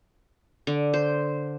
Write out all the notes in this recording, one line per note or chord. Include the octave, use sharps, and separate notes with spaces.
D3
C5